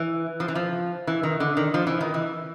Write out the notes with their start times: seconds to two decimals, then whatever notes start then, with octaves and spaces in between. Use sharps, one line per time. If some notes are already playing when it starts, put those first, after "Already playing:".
Already playing: E3
0.40 F3
0.48 E3
0.55 F3
1.07 E3
1.23 D#3
1.40 D3
1.57 D#3
1.74 F3
1.87 E3
2.01 D#3
2.14 E3